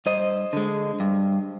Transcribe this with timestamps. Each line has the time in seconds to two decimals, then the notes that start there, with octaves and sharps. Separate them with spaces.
0.06 G2 C5 D#5
0.53 D3 G#3
1.00 G2